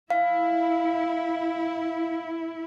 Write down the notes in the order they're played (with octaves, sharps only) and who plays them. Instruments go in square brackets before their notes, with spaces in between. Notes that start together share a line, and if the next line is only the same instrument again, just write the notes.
[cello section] E4 [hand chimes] F5